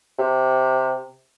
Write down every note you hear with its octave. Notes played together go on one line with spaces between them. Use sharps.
C3